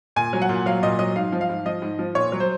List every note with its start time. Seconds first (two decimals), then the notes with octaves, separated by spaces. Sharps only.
0.16 A#2 G#5
0.33 F#3
0.42 F#5
0.49 A#2
0.66 F#3 F5
0.83 A#2 D#5
0.99 F#3 D#5
1.16 G#2 F5
1.32 F3
1.41 F5
1.49 G#2
1.66 F3 D#5
1.82 G#2
1.99 F3
2.15 A#2 C#5
2.32 F#3
2.40 C5